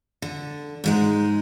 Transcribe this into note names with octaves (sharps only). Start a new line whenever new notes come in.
D3
G#2 G#3 D#4